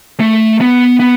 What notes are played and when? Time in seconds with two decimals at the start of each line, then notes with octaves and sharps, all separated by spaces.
0.20 A3
0.61 B3
1.00 B3